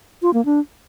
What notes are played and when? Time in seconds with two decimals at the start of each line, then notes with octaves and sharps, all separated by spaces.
0.22 F4
0.34 A#3
0.45 D4